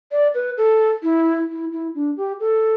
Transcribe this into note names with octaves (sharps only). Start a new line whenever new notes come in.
D5
B4
A4
E4
E4
E4
D4
G4
A4